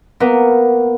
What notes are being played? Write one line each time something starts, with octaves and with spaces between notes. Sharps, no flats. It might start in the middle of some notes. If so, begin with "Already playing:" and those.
A#3 B3